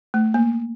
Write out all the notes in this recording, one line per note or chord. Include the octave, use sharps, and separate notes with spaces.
A3
A#3